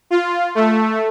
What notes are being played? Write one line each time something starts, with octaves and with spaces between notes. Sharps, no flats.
F4
A3